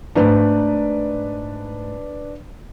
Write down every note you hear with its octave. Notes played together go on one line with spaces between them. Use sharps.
G#2 A3 D4 B4 D5 A#5